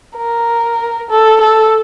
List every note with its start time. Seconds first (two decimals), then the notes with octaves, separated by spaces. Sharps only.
0.16 A#4
1.10 A4
1.41 A4